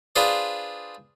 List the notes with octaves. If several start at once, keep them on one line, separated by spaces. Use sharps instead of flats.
D4 F4 G#4 B4 C5 D5